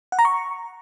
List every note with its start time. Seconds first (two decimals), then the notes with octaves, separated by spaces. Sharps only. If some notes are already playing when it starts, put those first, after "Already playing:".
0.12 F#5
0.19 A#5
0.25 C#6